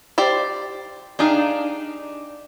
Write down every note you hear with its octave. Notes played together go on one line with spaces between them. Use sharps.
G4 C5 D5
D4 D#4 G4 G#4 F5